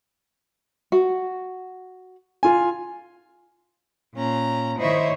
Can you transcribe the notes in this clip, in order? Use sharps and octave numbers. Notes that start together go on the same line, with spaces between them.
F#4
F4 G#5
A#2 C#4 A#5
D#3 E4 C5 C#5 D#5 E5